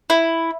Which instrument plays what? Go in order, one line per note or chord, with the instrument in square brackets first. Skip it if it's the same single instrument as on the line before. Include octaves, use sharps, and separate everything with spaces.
[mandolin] E4